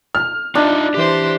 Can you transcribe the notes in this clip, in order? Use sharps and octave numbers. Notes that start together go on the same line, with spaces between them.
F6
D4 D#4 F4 D#5
E3 G4 C5